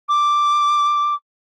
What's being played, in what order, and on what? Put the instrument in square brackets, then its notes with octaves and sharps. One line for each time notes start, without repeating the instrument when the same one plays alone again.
[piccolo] D6